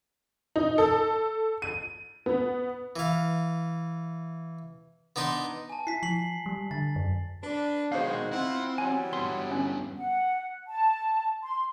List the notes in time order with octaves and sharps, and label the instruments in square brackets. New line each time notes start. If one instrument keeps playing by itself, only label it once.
[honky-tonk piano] D#4
A4
D#7
B3
[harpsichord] E3 F5
B3 D4 D#4 C6
[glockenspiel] G#5 A5
[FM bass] E4 [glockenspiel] B6 C7
[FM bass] F3 [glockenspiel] B6 C7 F#7
[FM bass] G3
[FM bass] D3 [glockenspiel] A6
[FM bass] F#2
[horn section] D4 [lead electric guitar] B4
[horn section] D#3 G#3 F#4 [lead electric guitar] B3 D#4 [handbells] C5 F5
[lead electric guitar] C4 [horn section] E4 F4 F#5
[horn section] E3 F#3 G3 [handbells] G#5
[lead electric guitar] G2 B3 [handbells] C6
[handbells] C#4
[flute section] F#5
A5
C6